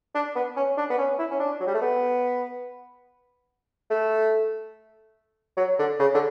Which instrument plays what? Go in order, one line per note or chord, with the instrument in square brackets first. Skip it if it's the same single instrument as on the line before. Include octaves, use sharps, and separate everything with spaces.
[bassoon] D4
B3
C#4
D4
B3
C#4
E4
C#4
D4
F#3
G3
A3
B3
A3
F#3
D3
C#3
D3